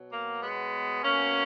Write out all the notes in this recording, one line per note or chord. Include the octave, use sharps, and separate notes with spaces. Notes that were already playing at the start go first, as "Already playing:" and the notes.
Already playing: B2 F#3
A#3
G#3 B3
B2 F#3 A#3 C#4